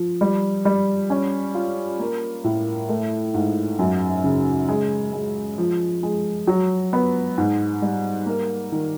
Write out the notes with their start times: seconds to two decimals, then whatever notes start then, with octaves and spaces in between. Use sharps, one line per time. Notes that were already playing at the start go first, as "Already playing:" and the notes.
Already playing: F3
0.21 G3
0.65 G3
1.10 C#4
1.55 F4
2.00 A#3
2.44 A2
2.89 A3
3.34 G#2
3.79 F#2
4.24 C#3
4.69 G#3
5.13 G#3
5.58 F3
6.03 G#3
6.47 F#3
6.93 B3
7.38 G#2
7.82 G3
8.26 A#3
8.72 D#3